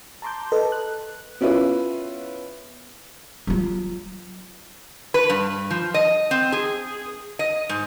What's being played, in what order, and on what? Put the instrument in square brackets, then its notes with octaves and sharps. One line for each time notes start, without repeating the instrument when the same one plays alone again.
[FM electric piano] A5 A#5 C6 D6 G6
A4 B4 D#5 A5
F#6
[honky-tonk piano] B3 C#4 E4 F4 B4
[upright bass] F#3 F4
[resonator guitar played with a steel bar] B4
G2
F3
D#5
C4
G#4
D#5
G#2